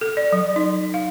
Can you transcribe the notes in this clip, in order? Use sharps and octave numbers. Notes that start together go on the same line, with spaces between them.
A4
D5
F#3
D#4
F5